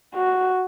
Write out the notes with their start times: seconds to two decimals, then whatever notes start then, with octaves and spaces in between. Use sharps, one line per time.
0.15 F#4